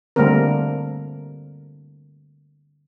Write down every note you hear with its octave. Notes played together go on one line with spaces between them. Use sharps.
D3 G3 A3 A#3 C4 A#4